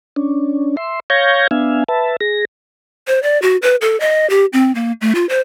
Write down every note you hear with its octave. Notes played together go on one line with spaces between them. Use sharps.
C#4 D4
E5 C6
C#5 F5 C#6 G6 G#6 A#6
B3 D4 E5 F5 G#5
B4 E5 A5
G#4 A#6
C5
D5
F#4
B4
A4
D#5
G4
C4
A#3
A3
F4
C5